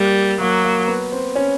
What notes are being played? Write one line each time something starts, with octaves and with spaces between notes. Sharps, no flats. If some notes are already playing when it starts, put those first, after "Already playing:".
Already playing: G3 A#3
F#3 A#3
A#3
B3
C4
C#4